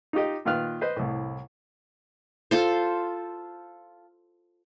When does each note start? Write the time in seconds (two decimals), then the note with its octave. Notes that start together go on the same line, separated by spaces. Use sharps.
0.13 D#4 F4 G4 D#5
0.45 A#2 D#3 F4 B4 F6 F#6
0.81 B4 C5 D#5
0.96 C2 A2
2.51 F4 A4 C5